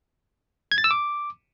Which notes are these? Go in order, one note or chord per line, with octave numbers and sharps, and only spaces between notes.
G#6
A6
E6
D6